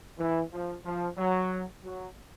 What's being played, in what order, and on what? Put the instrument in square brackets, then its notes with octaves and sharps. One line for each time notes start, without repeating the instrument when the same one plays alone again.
[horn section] E3
F3
F3
F#3
F#3